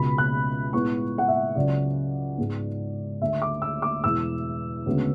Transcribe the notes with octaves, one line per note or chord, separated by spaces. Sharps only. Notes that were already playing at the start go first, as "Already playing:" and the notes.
Already playing: C#2 B2 G#3 B5
F#6
A2 G#3 B3 C#6
F#5
E5
C#2 C#3 F#3 D5
G#2 G#3 B3
D2 D3 A3 E5
D6
E6
D6
E2 B2 G#3 E6
D2 C#3 G#3 B3